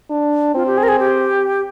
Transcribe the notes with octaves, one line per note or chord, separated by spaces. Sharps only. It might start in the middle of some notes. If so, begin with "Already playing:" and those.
D4
C4 F4
G4
G#4
A#4
G#4
G4